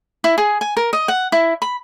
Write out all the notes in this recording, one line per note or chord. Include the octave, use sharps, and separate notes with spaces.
E4
G#4
G#5
A#4
D#5
F#5
E4
B5